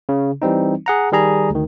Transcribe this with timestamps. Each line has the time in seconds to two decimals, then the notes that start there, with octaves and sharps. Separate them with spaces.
0.09 C#3
0.42 E3 G3 C4 D#4
0.86 G#4 F#5 A#5
1.12 D#3 G3 G#4 A#5
1.50 D2 D#3